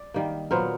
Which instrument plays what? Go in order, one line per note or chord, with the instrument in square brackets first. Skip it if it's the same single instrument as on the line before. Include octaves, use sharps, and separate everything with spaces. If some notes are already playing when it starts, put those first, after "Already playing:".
Already playing: [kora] D5
D#3 G3 A#3
A#2 F#3 B3 A#4 C5